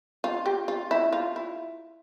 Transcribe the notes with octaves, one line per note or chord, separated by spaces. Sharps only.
F4
G4
F4
E4
F4
E4